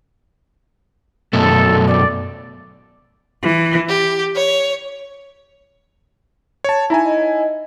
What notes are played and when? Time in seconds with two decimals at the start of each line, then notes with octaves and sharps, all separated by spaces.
1.33 F#2 B2 A3 A4
1.88 D5
3.42 E3
3.88 G4
4.34 C#5
6.64 C#5 A5
6.90 D#4 E4 E5 G#5 A#5
7.05 D#5